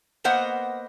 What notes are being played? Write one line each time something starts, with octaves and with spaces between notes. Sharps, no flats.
A#3 B3 C5 D#5 F#5